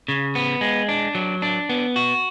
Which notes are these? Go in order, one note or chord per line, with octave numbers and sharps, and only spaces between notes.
C#3
B3
G#3
D4
F#3
D4
B3
F#4